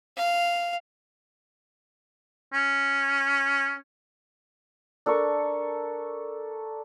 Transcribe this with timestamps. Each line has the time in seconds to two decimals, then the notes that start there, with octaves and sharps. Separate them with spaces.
0.17 F5
2.53 C#4
5.06 D4 A4 A#4 C#6